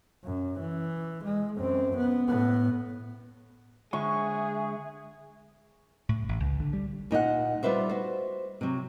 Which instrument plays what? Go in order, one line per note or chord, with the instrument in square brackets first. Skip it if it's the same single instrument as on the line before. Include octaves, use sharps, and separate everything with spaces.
[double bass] F#2
E3
G#3
F#2 C4
B3
A2 B3
[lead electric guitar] D3 G#3 [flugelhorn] G#4 [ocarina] E5 [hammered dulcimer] C#6
[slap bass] A2
A1
C#2
D3
G3
[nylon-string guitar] A#2 D#4 D5 F#5
G3 F4 B4 C5 E5
F#4 C5
C3 F#3